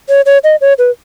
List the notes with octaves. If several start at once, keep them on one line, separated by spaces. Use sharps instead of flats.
C#5
C#5
D#5
C#5
B4